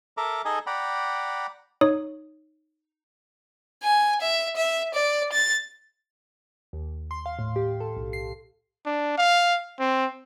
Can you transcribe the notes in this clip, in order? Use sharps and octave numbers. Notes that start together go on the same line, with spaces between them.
A4 A#4 E5 A#5 D6
D#4 G#4 A4 D#5 G#5
D5 F#5 G5 A#5 B5
D#4 C#5 D#6
G#5
E5
E5
D5
A6
D#2
C6
F5
A2
G4
A4
B1
C7
D4
F5
C4